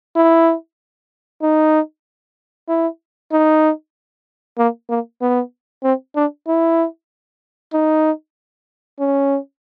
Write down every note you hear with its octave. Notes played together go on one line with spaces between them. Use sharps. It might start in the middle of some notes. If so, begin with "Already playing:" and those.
E4
D#4
E4
D#4
A#3
A#3
B3
C4
D4
E4
D#4
C#4